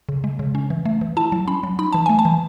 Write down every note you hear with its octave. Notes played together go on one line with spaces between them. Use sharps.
C#3
G#3
C#3
C#4
E3
A3
E3
E4 A5
F#3
C#4 B5
F#3
D#4 B5
E3 A5
A3 G#5
A5
E3